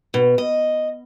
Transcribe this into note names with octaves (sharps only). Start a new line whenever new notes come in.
B2
D#5